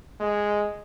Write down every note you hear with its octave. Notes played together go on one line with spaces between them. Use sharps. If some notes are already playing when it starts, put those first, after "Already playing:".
G#3